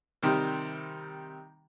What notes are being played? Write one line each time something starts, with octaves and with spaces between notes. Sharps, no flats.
C3 D#3 G3